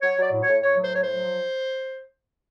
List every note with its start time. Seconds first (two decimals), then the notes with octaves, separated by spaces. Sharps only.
0.01 F#3 C#5
0.17 F#3 D5
0.31 A2
0.42 C#5
0.48 A2
0.62 A2 C#5
0.77 F#3
0.83 C5
0.93 A2 C#5
1.02 C5
1.08 F#3
1.23 F3